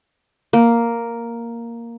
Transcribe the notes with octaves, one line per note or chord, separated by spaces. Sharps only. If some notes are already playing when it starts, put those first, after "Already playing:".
A#3